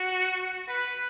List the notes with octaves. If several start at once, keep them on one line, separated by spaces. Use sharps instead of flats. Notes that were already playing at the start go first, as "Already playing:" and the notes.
Already playing: F#4
B4